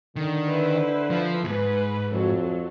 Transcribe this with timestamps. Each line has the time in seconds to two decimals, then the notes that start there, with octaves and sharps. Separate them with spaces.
0.16 D3 D#3
0.47 E4 B4 C5
1.10 F3
1.44 D#2 G#2 B4
2.12 F2 F#3 A4